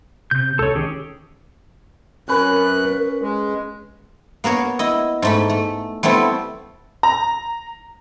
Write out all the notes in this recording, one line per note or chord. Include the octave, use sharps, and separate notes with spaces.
C3 G6
C#2 A4 C#5
D#3 C#4 G4 G#4
F#2 C#4 A#4 B4 F#6
G#3
A#3 B3 A#4 C#5
E4 D#5
G#2 A3 B5
A3
G3 A3 B3 C4 E4
A#5